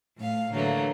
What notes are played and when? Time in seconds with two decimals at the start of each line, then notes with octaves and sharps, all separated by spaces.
0.18 A2 F5
0.53 D3 E3 F#3 A3 A#3